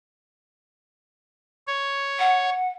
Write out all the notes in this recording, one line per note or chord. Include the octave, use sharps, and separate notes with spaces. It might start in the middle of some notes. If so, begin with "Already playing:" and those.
C#5
F#5